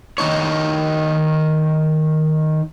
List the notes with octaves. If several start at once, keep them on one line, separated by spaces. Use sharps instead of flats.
D#3 D#4 C#5